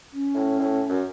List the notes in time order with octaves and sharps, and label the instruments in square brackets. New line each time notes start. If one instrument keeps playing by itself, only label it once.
[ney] C#4
[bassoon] A2
A2
F#2